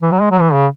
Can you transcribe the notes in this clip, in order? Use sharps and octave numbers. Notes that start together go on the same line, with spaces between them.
E3
F#3
G#3
F#3
E3
C#3